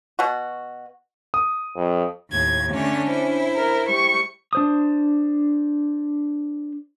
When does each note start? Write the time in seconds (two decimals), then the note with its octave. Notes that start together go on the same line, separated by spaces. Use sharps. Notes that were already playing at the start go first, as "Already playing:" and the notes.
0.19 B2 F#4
1.34 D#6
1.76 F2
2.31 D#2 A2 G#6
2.72 D3 A3 C#4 D4 C#5
3.10 E4 C5
3.55 A#4
3.89 G3 C#6
4.53 D4 C5 D#6